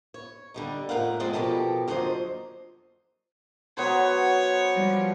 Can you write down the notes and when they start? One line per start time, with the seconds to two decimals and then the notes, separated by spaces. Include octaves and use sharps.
0.14 C#5
0.54 D3 G3 D#4
0.89 F2 A2 D#3 A#4 F5 F#5
1.20 F2 G3 G#3 C4 G#4 D5
1.33 B2 F3 G4 A4 A#4
1.88 F2 D3 F#3 A#3 C5 D#5
3.77 F#3 B3 C5 C#5
4.75 F3 G3